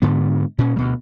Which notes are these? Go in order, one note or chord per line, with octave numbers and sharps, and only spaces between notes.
G#2 D3 B3
A#2 C#4
D2 B2 G3